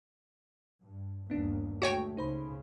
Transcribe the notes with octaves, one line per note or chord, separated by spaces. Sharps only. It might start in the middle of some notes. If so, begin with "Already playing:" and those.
G2
G1 D#2 B3 D4
D2 G#3 A3 F#4 C#5 G5
C#2 C#3 D#4 C5 B5